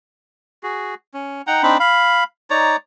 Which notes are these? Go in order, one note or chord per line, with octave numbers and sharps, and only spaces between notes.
F#4 G#4
C#4
D#4 F#5 G5 A#5
C4 D4 D#4 B5
F5 B5
D#4 C#5 D5 A#5